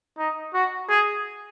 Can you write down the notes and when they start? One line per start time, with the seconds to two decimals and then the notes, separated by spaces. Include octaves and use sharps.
0.18 D#4
0.54 F#4
0.89 G#4